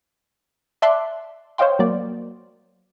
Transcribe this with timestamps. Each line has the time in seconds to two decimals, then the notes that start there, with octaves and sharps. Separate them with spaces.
0.82 D5 E5 A5 C6 D6 F#6
1.58 C5 C#5 D#5 F5 G5 C6
1.79 F#3 A#3 D5